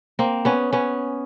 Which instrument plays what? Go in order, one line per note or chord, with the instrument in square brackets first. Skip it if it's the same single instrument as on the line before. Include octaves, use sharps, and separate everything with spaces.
[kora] A#3 C4
B3 C#4
B3 C#4